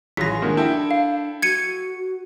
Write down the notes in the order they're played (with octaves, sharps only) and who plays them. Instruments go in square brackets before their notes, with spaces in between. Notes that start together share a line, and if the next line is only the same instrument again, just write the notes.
[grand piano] A1 [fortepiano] F#3 F4 G#4 [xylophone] A#6 B6
[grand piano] D#3 A#3 [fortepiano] F3 G#3 F#4 [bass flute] D4
[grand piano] E4 [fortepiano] A4 G5 A5
[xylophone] F5
[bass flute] F#4 [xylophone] G#6 C#7 D#7